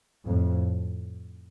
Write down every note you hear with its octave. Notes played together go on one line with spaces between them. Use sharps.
F2 A2